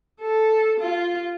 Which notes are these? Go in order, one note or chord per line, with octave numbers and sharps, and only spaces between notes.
A4
F4